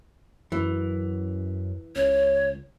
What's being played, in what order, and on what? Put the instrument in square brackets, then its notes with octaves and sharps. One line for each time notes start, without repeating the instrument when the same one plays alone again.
[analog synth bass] F#2 [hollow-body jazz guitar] E3
[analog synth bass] C#2 [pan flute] C#5